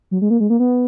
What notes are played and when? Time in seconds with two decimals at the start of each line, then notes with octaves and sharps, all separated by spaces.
0.11 F#3
0.22 G#3
0.30 A#3
0.40 G#3
0.50 A#3
0.60 B3